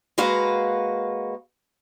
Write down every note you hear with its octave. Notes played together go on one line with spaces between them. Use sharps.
G#3 A#3 F#4 B4 F5